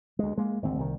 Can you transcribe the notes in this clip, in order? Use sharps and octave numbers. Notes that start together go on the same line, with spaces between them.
D2 G#3
G#3 A#3
G#1 D2 C4
C2 D#3